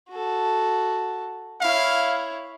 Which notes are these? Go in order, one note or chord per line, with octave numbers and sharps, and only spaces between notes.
F#4 A4
E4 C#5 F5